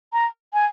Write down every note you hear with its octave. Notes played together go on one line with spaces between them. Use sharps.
A#5
G#5